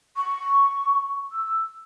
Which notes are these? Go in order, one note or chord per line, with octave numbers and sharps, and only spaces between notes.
C#6
E6